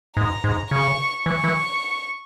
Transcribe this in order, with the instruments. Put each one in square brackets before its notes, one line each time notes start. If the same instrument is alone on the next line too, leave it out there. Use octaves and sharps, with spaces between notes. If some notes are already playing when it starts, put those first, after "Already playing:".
[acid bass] G#2 [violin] A#5
[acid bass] G#2
[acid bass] C#3 [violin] C#6
[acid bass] E3 [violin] C#6
[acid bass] E3